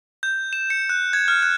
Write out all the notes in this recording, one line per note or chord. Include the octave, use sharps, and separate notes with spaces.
G6
E7
C#7
F#6
G#6
F6
F#6